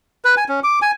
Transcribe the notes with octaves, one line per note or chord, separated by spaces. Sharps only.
B4
G#5
C#4
D6
G#5